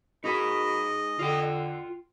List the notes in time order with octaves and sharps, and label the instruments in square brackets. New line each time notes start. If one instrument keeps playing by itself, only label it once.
[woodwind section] A#3 F#4 B5 [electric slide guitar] D#4 G#4 [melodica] D#5
[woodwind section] D3 [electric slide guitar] F4 G5